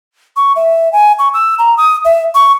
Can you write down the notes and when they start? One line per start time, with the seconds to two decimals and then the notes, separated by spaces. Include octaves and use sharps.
0.36 C#6
0.56 E5
0.93 G#5
1.19 C#6
1.33 E6
1.59 A#5
1.77 D#6
2.05 E5
2.35 C#6